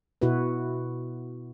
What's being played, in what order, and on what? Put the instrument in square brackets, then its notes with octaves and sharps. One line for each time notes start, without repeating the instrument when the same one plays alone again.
[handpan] B2 E4 F#4 B4